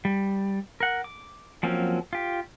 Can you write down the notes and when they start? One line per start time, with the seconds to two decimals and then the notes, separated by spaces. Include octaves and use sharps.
0.05 G3
0.80 A#4 F#5
1.04 D6
1.63 F3 F#3 A#3 C4 C#4
2.13 F4 G4